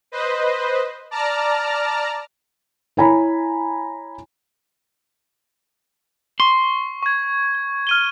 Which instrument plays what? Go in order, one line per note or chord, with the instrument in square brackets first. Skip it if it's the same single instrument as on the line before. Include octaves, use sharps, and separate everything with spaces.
[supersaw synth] B4 C5 D#5
D5 A5 A#5 F6
[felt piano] E4 C#5 G#5 A#5 B5
[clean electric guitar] C6 [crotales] C#6
[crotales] C#6 G#6
F6 D#7 G7